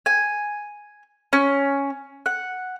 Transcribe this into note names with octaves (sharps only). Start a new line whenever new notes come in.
G#5
C#4
F#5